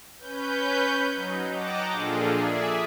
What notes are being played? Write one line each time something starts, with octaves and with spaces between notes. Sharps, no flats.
C#4 B4 G6
F#3 D#4
D#5 F#5 G5 A5 A#5 D6
A#2 F3 D4 F4 G#4 A4
G#4 D5 E5